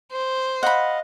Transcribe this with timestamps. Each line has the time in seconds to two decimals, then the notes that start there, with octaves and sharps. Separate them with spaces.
0.12 C5
0.63 D#5 F5 F#5 B5